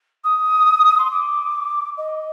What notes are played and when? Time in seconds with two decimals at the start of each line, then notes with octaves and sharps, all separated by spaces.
0.24 D#6
0.98 C6
1.11 D6
1.97 D#5